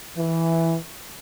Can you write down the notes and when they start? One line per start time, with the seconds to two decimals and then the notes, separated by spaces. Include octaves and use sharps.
0.17 E3